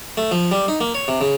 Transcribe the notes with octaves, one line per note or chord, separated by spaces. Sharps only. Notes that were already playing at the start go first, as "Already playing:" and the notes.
A3
F3
G3
D#4
A#3
C#5
C3
C#3